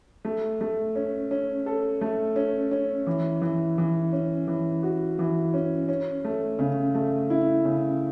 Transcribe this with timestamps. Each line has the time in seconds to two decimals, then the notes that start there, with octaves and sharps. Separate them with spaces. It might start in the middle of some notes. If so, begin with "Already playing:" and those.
0.25 A3
0.61 A3
0.95 C#4
1.31 C#4
1.66 A4
2.01 A3
2.36 C#4
2.71 C#4
3.07 E3
3.42 E3
3.78 E3
4.12 C#4
4.47 E3
4.83 F#4
5.19 E3
5.54 C#4
5.88 C#4
6.25 A3
6.59 C#3
6.95 A3
7.30 E4
7.65 C#3